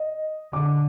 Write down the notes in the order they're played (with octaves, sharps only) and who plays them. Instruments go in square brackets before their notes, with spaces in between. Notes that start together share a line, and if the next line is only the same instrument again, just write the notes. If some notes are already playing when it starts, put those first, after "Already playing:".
Already playing: [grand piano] D#5
[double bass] D3 [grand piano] D6